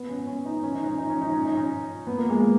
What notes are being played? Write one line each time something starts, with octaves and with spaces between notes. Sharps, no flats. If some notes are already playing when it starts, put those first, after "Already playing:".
Already playing: B3
C#4
C#4
D#4
C#4
D#4
C#4
D#4
C#4
D#4
C#4
D#4
C#4
B3
A#3
G#3
A#3